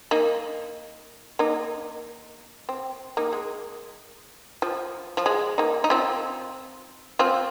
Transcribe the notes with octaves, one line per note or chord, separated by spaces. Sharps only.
A#3 D#4
A#3 D#4
C4
A#3 D#4
G#3
F3
F3
G#3
A#3 D#4
D#4
C4 F4
C4 F4